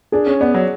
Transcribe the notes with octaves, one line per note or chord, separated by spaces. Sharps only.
D4 G#4
C#4
B3 D5
F#3